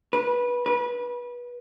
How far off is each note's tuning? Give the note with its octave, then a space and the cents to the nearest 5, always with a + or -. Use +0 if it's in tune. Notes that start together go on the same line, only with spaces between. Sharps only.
B4 -20
B4 -25